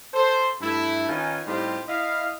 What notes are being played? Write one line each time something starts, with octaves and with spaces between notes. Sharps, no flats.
A4 C5
G2 A3 E4
D#3 C#4 D#4 F4 B4 G#5
A2 G3 C4 D#4 F4 G4
E4 D#5 F5